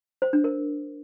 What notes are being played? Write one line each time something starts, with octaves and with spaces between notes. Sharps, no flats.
C5
D4
A#4